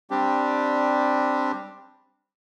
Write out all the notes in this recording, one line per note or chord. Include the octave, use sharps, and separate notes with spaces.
G3 C4 D4 G4